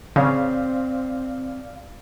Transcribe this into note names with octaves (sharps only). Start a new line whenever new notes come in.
C#3 C4 D5 F5